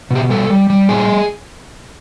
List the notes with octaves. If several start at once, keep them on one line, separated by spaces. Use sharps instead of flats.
B2 G4
G3 A4
G3
G3
A#2 G#4